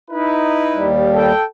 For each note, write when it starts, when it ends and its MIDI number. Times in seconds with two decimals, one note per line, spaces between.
0.10 0.91 63
0.10 0.91 64
0.10 0.91 71
0.74 1.32 39
0.74 1.32 55
1.14 1.43 69
1.14 1.43 79